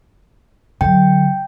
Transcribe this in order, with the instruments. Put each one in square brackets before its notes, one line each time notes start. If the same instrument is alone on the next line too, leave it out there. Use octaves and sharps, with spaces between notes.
[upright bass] D3 F#3 [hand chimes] G5